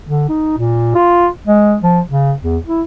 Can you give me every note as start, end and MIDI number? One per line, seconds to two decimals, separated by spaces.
0.09 0.24 50
0.29 0.57 63
0.58 0.94 46
0.95 1.27 65
1.47 1.77 56
1.82 2.00 53
2.09 2.34 49
2.42 2.58 40
2.67 2.82 64